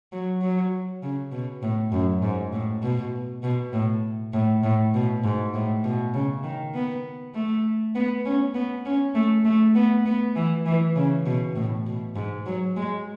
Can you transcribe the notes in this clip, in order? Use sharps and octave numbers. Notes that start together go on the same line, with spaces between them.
F#3
F#3
C#3
B2
A2
F#2
G#2
A2
B2
B2
A2
A2
A2
B2
G#2
A2
B2
C#3
D#3
B3
A3
B3
C#4
B3
C#4
A3
A3
B3
B3
E3
E3
C#3
B2
A2
B2
G#2
F#3
G#3